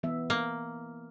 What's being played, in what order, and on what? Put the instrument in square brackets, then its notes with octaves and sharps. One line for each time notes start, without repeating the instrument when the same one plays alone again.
[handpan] E3 B3 E5
[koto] A#3